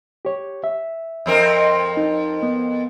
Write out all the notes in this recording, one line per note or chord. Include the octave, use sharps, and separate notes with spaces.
G4 C#5
E5
F2 C4 A#4
D#4
B3